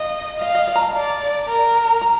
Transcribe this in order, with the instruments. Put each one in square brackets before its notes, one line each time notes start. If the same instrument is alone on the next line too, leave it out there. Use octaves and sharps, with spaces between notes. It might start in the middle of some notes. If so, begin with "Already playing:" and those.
Already playing: [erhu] D#5 [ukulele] F5
[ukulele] D#5 [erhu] F5
[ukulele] D#5
D5
A#5
A5
[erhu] D5
A#4
[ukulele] A#5